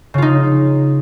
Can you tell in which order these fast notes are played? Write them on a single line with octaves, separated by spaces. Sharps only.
C#3 F4 D#4